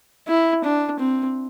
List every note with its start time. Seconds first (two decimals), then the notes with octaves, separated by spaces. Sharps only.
0.28 E4
0.64 D4
0.99 C4